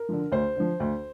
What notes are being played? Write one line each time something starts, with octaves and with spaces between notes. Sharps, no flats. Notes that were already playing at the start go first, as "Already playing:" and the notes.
Already playing: A#4
D3 F3
D2 C5
D3 F3
D2